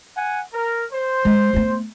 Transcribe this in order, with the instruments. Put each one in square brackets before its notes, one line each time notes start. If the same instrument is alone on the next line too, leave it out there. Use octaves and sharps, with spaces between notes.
[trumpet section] F#5 G#5
A#4
C5
[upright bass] G#3
A3 B3